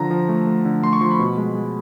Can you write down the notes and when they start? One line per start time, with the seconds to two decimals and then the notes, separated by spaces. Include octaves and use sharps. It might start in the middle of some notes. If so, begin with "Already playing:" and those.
Already playing: D3 F3 A#5
0.11 F3
0.29 A3
0.46 A3
0.65 D3
0.83 A3 C6
0.93 C#6
1.01 F3 C6
1.11 B5
1.19 B2
1.38 G#3
1.55 G#3